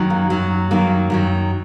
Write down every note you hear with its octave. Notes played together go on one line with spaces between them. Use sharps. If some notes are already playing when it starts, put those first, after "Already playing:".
Already playing: F#2 D#3 F#3
A#3
F#2 D#3 F#3
F#2 D#3 F#3 A#3
F#2 D#3 F#3